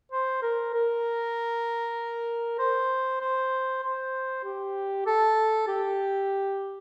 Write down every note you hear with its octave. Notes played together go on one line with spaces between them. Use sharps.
C5
A#4
A#4
C5
C5
C5
G4
A4
G4